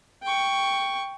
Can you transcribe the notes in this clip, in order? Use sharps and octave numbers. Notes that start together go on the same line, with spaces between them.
G5 C#6